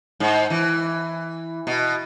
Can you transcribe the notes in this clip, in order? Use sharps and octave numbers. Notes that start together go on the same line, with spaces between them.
G#2
E3
B2